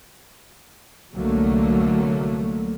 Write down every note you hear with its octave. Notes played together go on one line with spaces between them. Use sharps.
C2 D3 F#3 A3 A#3